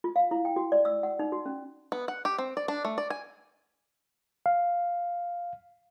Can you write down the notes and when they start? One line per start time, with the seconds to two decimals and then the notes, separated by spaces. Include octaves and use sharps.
0.04 F4
0.16 F5
0.31 E4
0.45 G5
0.56 F#4
0.72 D5
0.85 E6
1.03 F#5
1.19 D#4
1.32 F#4
1.46 C#4
1.92 B3
2.08 F#5
2.25 G4
2.38 C4
2.57 D5
2.68 D4
2.85 A3
2.98 D5
3.10 G#5
4.46 F5